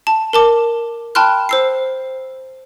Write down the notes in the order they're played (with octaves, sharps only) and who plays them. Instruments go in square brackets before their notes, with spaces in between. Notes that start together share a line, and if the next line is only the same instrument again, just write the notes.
[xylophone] A5
A#4 A5 D6
G5 A5 B5 C6 F6 F#6
C5 E6 C7